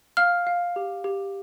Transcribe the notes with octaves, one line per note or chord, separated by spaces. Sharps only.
F5 F6
F5
G4
G4